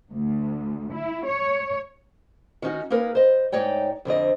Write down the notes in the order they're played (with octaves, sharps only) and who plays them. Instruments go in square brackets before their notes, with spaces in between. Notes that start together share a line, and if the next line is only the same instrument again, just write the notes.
[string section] D2
E4
C#5
[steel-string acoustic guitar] D#3 C#4 D#4 F#4
A#3 D#4 G#4 A#4 B4
C5 D#5
G#2 D#4 C#5 D5 G5
F2 D3 C4 D#5